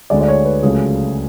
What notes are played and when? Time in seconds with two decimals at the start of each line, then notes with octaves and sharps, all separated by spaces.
0.10 D2 D3 G#3 D5
0.21 D5
0.28 C#5
0.45 B4
0.63 C#2 C#3 F#3 A3 G#4